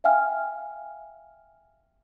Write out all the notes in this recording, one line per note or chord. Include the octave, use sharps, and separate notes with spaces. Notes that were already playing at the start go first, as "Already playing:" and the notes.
E5 F5 G5 G#5 F6